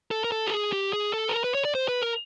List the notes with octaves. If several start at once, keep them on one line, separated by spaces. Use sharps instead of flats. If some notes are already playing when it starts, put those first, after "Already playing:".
A4
A#4
A4
G4
G#4
G4
G#4
A4
B4
A#4
B4
C#5
D5
C5
B4
A#4